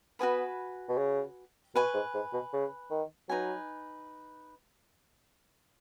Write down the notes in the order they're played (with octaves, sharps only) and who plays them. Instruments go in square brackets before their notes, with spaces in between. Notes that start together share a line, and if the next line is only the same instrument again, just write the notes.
[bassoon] B3 [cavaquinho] F#4 B4 G#5 B5
[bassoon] B2
C#3
[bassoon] B2 [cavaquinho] B4 G#5 C#6
[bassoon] G#2
G#2
B2
C#3
D#3
[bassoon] F#3 [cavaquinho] D#4 B4 G#5